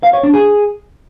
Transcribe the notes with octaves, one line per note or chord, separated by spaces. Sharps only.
F5
C#5
D4
G#4